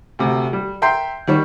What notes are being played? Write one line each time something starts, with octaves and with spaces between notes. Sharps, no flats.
D2 C3
G3
E5 G5 A#5 C6 G6 C7
D#3 G3 C#5